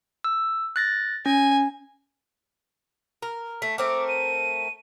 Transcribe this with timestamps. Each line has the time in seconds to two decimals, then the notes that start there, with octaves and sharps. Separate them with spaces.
0.24 E6
0.76 F#6 A6 A#6
1.26 C#4 G#5
3.22 A#4
3.62 A3 B6
3.78 A3 C4 A#4 D6
4.08 D#7